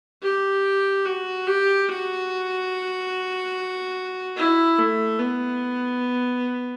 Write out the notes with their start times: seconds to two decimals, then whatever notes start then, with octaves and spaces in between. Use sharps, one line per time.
0.23 G4
1.06 F#4
1.47 G4
1.89 F#4
4.36 E4
4.78 A3
5.19 B3